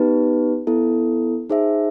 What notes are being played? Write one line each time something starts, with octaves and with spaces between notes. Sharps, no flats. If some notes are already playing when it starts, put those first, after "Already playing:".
Already playing: B3 D#4 G4 B4
B3 E4 A4
D#4 G#4 C5 E5